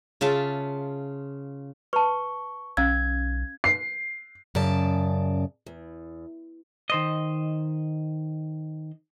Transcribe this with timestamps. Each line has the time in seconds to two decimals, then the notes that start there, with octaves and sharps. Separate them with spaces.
0.21 C#3 F4 E5 A5
1.93 B4 A5 C#6
2.77 B1 C#4 F5 E6 G#6
3.64 C7
4.55 F#2 C#3 D5 A5
5.67 E2
6.90 D#3 C5 D#5